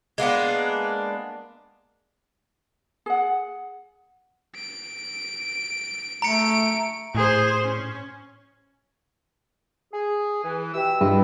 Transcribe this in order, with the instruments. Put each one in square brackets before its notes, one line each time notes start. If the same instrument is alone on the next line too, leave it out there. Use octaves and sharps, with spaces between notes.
[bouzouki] G#3 A#3 B3 D4
[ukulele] G#4 F#5
[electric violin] D7
[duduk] A3 [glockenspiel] A#5 C#7 [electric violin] D7
[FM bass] A2 [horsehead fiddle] G#4 C5
[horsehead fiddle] C#4
[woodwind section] G#4
E3
[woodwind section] B2 E5 E6 [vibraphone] G4 G5
[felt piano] G2 [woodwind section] E4 F4 D#5